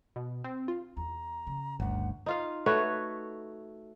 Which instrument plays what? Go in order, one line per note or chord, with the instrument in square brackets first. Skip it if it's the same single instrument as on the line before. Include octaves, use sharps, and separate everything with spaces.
[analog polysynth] B2
C4
F4
[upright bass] E2 [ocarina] A#5
[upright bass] C#3
[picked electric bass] G1 D2 [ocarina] F#5
[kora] D#4 F4 F5
A3 F#4 B4 C#5